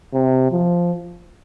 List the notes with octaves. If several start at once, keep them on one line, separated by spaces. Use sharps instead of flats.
C3
F3